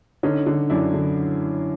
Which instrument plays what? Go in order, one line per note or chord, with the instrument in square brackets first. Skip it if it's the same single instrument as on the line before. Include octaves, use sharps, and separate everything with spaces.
[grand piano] D3 C#4 D#4
D3
F#2 D4 E4
D3